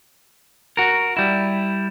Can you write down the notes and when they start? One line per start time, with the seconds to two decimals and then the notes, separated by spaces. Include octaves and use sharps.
0.77 F#4 A#4
1.17 G3 E4